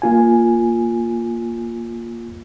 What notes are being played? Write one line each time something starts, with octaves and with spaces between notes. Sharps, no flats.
A#3 F4 G#5